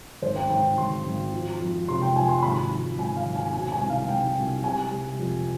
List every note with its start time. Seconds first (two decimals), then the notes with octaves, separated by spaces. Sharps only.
0.22 G#1 C5
0.36 G5
0.50 G#1 G5
0.78 G#1 C6
1.06 G#1
1.33 F3
1.60 F2
1.88 C3 C6
2.01 G5
2.15 F3 G#5
2.29 C6
2.43 G#1 B5
2.71 F3
2.98 G#1 G#5
3.17 F5
3.26 G#1
3.36 G#5
3.53 B2 G#5
3.72 G#5
3.81 C2
3.90 F5
4.09 C2 G5
4.37 C2
4.64 C3 G#5
4.91 G3
5.19 F2